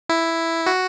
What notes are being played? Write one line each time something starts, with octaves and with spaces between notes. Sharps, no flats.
E4
F#4